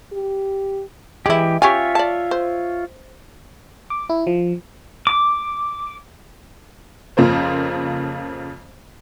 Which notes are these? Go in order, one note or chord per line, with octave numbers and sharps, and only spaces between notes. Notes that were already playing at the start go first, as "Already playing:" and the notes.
G4
E3 G#3 E4 G4
C#4 F4 G4 C#5 E5 G#5
D5 A5
C5
D6
E4
F3
D6
F2 C#3 F3 A#3 C5